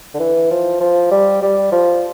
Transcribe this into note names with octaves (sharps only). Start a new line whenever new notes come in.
D3
E3
F3
F3
G3
G3
F3